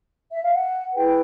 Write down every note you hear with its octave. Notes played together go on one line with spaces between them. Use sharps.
E5
F5
F#5
E4 G#4 B4 G5